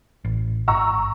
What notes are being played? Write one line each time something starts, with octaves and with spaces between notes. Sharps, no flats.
A1
G#1 A#5 C#6 E6